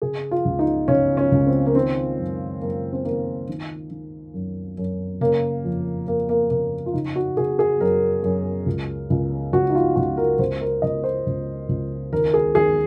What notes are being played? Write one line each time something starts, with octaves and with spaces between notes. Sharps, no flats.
C#3 G#4
F4
C#2
D#4
C#3 C#4
C#4
C#2
C4
A#3
D#3 C4
F#2
F#2 A#3
C4
D#3 A#3
D#3
D#3
F#2
F#2
C#3 A#3
F2
F2 A#3
A#3
C#3 A#3
F4
C#3 D#4
F#4
C#3 G#4
G#4
F#2 A#4
F#2
C#2
C#2
C#2 F#4
D#4
F4
C#2 F#4
A#4
C#2 C5
A#4
C#2 D#5
C5
C#2
C#2
D#2 A#4
G#4
D#2 G#4